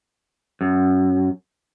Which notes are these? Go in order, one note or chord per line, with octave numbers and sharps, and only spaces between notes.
F#2